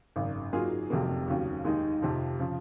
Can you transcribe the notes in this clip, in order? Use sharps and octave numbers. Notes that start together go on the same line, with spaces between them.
G#1 F#2 C#3
G#2 F#3 A#3 F4 G#4
F1 F2 C3 F#3 A#3
D#2 C#3 F#3
D#2 D#3 G#3 D#4
F2 C3 F3
C#3 F3